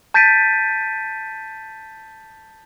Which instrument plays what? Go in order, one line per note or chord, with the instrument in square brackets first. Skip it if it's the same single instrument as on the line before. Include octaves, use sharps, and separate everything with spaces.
[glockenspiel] A5 G6 A6 B6 D7 D#7